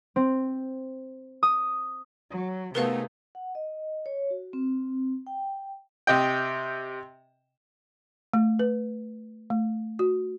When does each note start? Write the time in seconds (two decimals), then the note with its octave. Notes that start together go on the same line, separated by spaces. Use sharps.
0.16 C4
1.43 D#6
2.31 F#3
2.75 C3 A3 B3 D#4 G#4 A#4 B4 F5
3.35 F#5
3.55 D#5
4.06 C#5
4.31 F#4
4.53 C4
5.27 G5
6.07 C3 D#5 G5
8.34 A3
8.59 B4
9.50 A3
9.99 F#4